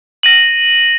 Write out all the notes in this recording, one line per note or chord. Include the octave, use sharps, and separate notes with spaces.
A#6 D#7 F#7